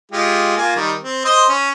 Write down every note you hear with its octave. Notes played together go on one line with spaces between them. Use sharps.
G#3 F4 G4
A#3 F4 G#5
D#3 G3
C4
C5 D#5 C6
C#4